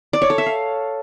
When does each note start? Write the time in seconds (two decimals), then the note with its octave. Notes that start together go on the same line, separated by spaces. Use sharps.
0.13 D5
0.22 C#5
0.30 A4
0.38 E5
0.46 F5